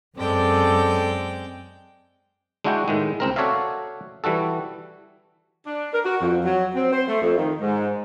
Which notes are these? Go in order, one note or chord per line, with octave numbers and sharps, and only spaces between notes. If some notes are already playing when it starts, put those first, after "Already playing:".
F#2 G#3 C4 A4 D5 G5
G#3 D4 E4 F#4 F#5 G5
A2 D#3 G#3
C#2 C4 A#4
F#4 A4 C#5 D5 E5 F5
E3 G3 F#4 A4
D4
A#4
F#4
F2
F#3
C4
C5
A3
F2
D#3
G#2